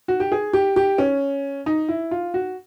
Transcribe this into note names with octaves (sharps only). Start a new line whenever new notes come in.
F#4
G4
G#4
G4
G4
C#4
D#4
E4
F4
F#4